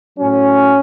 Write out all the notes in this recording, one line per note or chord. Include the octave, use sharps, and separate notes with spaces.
A2 F#3 C#4